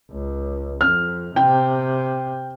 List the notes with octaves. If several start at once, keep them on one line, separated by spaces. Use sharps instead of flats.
C#2
F2 F6
C3 G5